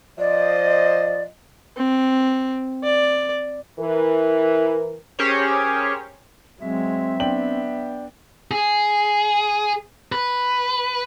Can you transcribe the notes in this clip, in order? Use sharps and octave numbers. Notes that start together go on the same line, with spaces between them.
F3 C5 D5 D#5
C4
D5
E3 A#4
C#4 G4 G#4 A#4 C5 C#5
F#3 G#3 C4 E5
B3 D4 G5 F#7
G#4
B4